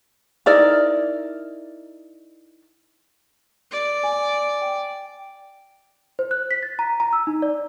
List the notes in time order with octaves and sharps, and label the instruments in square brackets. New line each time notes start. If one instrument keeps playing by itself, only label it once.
[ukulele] D#4 E4 A#4 D5
[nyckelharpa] D5
[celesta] G#5
G5
C5
F#6
B6
A6
A#5
A#5
E6
D#4
D5